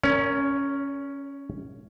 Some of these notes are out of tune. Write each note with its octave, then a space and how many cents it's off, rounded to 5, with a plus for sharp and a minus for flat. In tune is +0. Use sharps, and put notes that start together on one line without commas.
C#4 +0 A#4 -10 C#5 +40